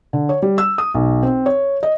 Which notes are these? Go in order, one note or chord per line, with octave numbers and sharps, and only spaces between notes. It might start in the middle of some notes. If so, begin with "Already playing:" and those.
D3
C#5
G3
E6
D#6
B1
C4
C#5
D#5